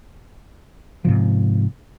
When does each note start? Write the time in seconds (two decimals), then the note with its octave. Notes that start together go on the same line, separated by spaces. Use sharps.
1.05 G#2 C3 F3